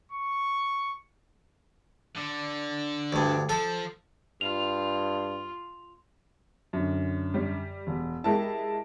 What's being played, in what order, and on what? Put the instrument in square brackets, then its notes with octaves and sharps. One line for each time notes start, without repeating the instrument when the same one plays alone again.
[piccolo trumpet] C#6
[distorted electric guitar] D3
[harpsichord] D2 G2
[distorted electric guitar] F3 [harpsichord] A4
[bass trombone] G2 [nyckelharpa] F4 [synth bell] F7
[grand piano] F#2 D3
[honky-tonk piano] G3
[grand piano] E1
[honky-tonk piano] G#3 E4 [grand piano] G4 A#4 A5